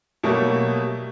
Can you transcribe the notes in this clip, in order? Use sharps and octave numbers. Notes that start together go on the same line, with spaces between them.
B2 F#3 G3 A3 A#3